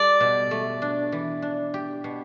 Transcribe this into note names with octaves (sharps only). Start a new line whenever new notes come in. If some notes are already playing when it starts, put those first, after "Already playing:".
Already playing: G3 A4 D5
B2
A3
D4
E3
D4
G4
B2